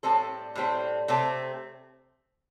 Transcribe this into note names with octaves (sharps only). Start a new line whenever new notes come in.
A2 G3 C4 A4
A2 G3 C4
C3 A3 C4